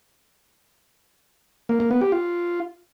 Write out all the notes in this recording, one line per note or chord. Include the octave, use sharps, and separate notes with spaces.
A#3
A#3
B3
G4
F4